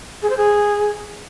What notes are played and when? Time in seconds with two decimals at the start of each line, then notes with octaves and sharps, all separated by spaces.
0.22 G#4
0.30 C5
0.37 G#4